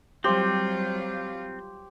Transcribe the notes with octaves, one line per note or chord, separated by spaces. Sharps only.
F#3 G3 C4 F4 G4 C5